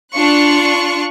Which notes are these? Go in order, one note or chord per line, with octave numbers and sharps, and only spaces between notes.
D4 F4 C#6 F#6